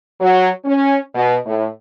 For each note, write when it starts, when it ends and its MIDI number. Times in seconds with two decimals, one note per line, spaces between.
0.20 0.49 54
0.65 0.97 61
1.15 1.35 47
1.45 1.65 45